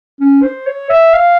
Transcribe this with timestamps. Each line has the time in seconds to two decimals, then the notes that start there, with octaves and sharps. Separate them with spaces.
0.20 C#4
0.43 C5
0.67 C#5
0.90 E5
1.14 F5